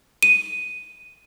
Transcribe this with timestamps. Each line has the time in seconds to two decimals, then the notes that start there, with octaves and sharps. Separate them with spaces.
0.23 D#7